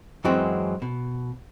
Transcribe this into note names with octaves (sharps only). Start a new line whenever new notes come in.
F#2 E3 F#3 G#3 C4
B2